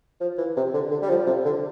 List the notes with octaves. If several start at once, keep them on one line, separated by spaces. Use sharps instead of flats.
F3
E3
C3
D3
D3
G3
F3
C3
D3